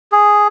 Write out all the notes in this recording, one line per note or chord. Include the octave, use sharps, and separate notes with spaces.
G#4